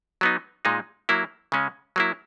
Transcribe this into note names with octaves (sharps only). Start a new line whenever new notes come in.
F#3 B3 D#4
A#2 G#3 D#4
F#3 A#3 E4
C#3 G#3 C#4
F#3 A#3 E4